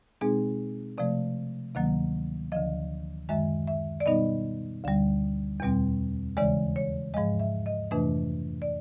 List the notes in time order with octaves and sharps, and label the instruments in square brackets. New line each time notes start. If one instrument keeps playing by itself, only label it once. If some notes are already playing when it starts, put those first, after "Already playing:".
[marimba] B2 G#3 C4 D#4 G#4
C3 F3 A3 D5
D2 C3 D#3 F#3 A#3
D2 D3 F3 D#5
F#2 D#3 G#3 E5
E5
D5
B2 G3 B3 D#4 D#5
D2 D3 G3
E2 B2 G3 C4
D#2 C#3 E3 G#3 D5
C#5
G#2 F3 G#3 D#5
E5
D#5
F2 C3 E3 A3 D4 B4
D5